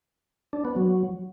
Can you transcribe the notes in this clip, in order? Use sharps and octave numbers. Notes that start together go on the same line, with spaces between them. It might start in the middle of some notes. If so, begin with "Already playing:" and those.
D4
B3
F#3